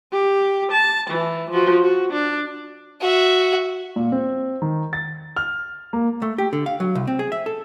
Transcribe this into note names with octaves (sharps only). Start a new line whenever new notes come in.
G4
A5
E3
F3 F#4
F#4
D4
F#4 E5
A#2
C4
D#3
A6
F6
A#3
A3
G4
D3
F5
F#3
C2
C4
G#4
E5
A4